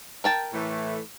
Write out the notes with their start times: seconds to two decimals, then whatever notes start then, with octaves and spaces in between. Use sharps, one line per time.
0.24 A#4 G5 A5
0.53 A2 E3 A3